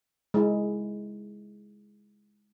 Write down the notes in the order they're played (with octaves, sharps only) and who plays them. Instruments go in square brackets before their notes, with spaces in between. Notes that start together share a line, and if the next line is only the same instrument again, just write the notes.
[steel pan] G#3 E4